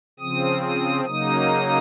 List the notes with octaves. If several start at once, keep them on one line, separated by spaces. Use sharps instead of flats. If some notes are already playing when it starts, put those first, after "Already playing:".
C#3 F3 C4 D#6
D#6
C#3 F#3 A#3 D#4 D#6